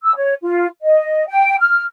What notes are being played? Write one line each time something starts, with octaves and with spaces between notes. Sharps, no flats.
E6
C#5
F4
D#5
G5
F6